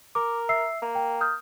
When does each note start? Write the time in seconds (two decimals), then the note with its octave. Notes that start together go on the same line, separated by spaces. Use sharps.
0.15 A#4 D6
0.49 E5 E6 C7
0.82 A#3
0.95 G5
1.21 D#6 F6 G6